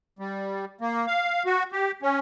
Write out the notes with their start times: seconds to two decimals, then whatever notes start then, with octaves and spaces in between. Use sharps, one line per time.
0.19 G3
0.81 A#3
1.07 F5
1.46 F#4
1.72 G4
2.02 C#4